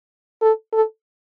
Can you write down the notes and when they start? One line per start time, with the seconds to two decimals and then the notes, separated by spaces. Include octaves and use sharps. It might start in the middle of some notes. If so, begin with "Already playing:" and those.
0.42 A4
0.73 A4